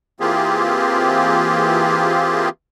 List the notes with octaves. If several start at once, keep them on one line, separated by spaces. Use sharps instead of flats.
E3 A#3 C4 F4 G4 G#4